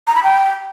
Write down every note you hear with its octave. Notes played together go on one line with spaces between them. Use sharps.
A#5
B5
G5